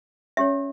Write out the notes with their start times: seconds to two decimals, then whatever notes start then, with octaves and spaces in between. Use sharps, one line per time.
0.37 C#4 G4 C#5 E5